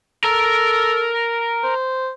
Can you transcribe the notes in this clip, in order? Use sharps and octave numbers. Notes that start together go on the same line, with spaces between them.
A4 A#4 A#5
C5